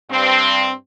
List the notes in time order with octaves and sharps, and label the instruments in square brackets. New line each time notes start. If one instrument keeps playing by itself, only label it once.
[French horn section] G2 C4